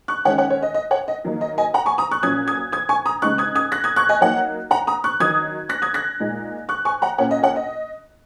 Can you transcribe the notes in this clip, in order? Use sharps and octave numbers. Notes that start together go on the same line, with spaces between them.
C#6 F#6
D#3 G#3 C#4 C#5 F#5
C#5 F#5
C#5
D#5
D#5
C#5 F#5
D#5
D#3 F#3 A#3 D#4
D#5
D#5 G#5
F#5 A#5
G#5 C#6
A#5 D#6
C#6 F#6
A#2 F#3 C#4 D#6 G#6
D#6 G#6
D#6 G#6
G#5 C#6
A#5 D#6
C#3 G#3 D#4 C#6 F#6
D#6 G#6
D#6 G#6
F#6 A#6
D#6 G#6
C#6 F#6
D#5 G#5
F#3 A#3 D#4 C#5 F#5
F#5 A#5
A#5 D#6
C#6 F#6
D#3 F#3 D#4 D#6 G#6
F#6 A#6
D#6 G#6
F#6 A#6
A#2 G#3 D#4
C#6 F#6
G#5 C#6
F#5 A#5
A#2 A#3 C#4 C#5 F#5
D#5
C#5 F#5
D#5